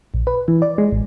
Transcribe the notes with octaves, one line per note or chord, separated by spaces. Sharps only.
A#1
B4
E3
D5
G#3
A1